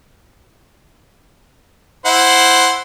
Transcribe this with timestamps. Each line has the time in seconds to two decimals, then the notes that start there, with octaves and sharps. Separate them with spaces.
2.05 E4 C5 F#5